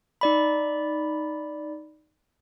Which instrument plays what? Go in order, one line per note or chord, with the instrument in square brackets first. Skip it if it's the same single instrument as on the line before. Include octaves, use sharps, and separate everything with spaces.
[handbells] D#4 D5 B5